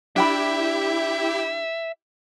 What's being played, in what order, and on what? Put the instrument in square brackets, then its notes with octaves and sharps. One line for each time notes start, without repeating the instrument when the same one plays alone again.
[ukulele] D4 G5 B5 [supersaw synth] E4 G4 [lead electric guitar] E5